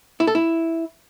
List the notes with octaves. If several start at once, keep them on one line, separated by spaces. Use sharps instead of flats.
E4
A4
E4